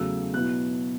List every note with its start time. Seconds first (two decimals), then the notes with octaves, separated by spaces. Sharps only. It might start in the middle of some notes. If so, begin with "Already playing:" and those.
Already playing: E2 C#3 F#3 A3 E6
0.34 B2 F#3 B3 E4 F#6